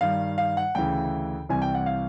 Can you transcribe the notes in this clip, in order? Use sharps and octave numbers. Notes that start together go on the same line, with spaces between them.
G2 D#3 F5
F5
F#5
D2 C#3 E3 G5
C2 C3 E3 G#5
G5
F#5
F5